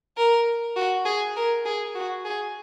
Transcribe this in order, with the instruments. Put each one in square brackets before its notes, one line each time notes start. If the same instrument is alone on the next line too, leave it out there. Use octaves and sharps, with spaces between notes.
[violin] A#4
F#4
G#4
A#4
G#4
F#4
G#4